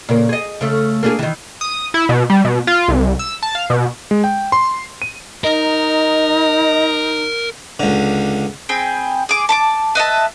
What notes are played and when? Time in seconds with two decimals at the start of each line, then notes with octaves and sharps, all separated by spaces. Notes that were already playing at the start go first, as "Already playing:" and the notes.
0.09 A#2 C#3 A#4
0.29 G#4 D#5
0.61 C#3 A3
1.03 A#3 D4 G#4
1.19 D#3 E3
1.61 D#6
1.94 E4
2.09 B2
2.30 G3
2.45 B2
2.67 F4
2.88 C2
3.19 E6
3.43 A5
3.55 F5
3.70 B2
4.11 G#3
4.24 G5
4.52 C6
5.02 D#7
5.44 D#4 A#4 D#5
7.80 C#2 D3
8.69 C4 G#4 G5 B5
9.29 G#4 D6
9.49 A5 B5 D6
9.95 B4 D#5 E5 A5